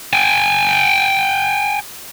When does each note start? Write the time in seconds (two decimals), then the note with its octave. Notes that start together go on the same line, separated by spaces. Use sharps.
0.13 G5 G#5